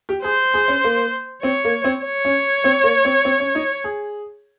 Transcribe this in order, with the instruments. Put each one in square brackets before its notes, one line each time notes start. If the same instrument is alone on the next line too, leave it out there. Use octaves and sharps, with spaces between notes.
[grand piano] G4
[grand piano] G#4 [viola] C5
[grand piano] G#4
C#4
A#3
[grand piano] C4 [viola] C#5
[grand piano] A#3
C4
[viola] C#5
[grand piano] C#4
C4
A#3
C4
C4
C#4
D#4
G#4